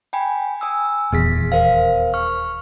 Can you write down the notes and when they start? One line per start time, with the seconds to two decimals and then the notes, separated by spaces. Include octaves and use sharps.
0.13 G5 G#5 B5
0.61 G#5 D#6 E6
1.12 D#1 E2 B3 G#4 B6
1.52 A#4 C5 F5
2.14 C#6 F6